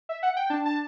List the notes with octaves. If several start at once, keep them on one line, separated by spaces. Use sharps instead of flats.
E5
F#5
G5
D4 A5
A5